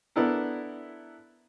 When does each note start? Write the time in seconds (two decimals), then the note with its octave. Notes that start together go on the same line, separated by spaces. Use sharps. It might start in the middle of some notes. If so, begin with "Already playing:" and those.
0.16 B3 D4 E4 A4 A#4